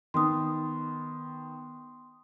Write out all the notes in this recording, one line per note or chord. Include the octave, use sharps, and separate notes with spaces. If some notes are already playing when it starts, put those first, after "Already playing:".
D#3 B3 C6 D#6